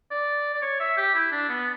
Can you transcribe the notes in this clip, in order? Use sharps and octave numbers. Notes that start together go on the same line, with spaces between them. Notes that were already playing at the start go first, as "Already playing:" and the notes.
D5
D5
C#5
E5
G4
E4
D4
B3